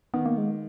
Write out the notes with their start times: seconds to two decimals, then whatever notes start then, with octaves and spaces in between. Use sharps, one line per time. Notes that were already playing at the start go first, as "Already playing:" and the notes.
0.14 D#3 B3
0.26 A#3
0.38 G#3